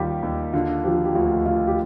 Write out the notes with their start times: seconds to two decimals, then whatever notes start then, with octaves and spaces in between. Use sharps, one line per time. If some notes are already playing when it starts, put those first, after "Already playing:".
Already playing: D#2 D#3 G3 F4 G4
0.23 D#2
0.53 D3 F4
0.84 F3 G4
1.05 G4
1.15 D2 F4
1.46 D2 F4
1.67 G4